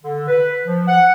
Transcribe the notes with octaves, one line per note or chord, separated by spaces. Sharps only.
D3
B4
F3
F#5